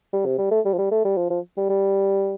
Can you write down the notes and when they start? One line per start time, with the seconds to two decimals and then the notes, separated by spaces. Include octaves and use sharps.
0.13 G3
0.25 C3
0.38 G3
0.51 A3
0.65 G3
0.73 F3
0.78 G3
0.91 A3
1.05 G3
1.17 F3
1.30 F3
1.57 G3
1.69 G3